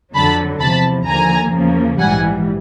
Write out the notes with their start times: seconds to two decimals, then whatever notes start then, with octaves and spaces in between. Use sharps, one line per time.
0.15 F2 D3 F#3 A5 B5
0.61 E2 C3 F3 A5 B5
1.07 D#2 D3 F3 A#3 G#5 A#5
1.54 E2 C#3 F3 A#3
1.99 A#1 G#2 E3 G3 F#5 G#5